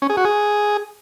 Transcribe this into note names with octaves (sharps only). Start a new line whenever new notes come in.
C#4
G#4
F#4
G#4